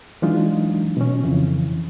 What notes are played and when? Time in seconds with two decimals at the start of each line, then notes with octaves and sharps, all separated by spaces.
0.22 E3 F#3 G#3 D4 D#4 F4
0.97 B2 C#4
1.23 F2 C#3 E3